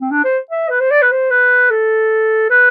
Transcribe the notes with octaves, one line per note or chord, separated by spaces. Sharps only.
C4
D4
C5
E5
B4
C5
D5
B4
C5
B4
A4
B4